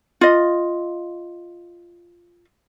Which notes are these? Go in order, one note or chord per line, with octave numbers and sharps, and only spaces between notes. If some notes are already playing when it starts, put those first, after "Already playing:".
F4 D#5